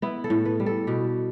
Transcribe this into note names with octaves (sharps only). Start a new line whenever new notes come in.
B3 E4
A4
A2
B4
G3
A4
B2 G4